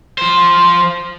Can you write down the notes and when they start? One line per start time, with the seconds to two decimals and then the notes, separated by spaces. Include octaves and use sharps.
0.18 F3 C5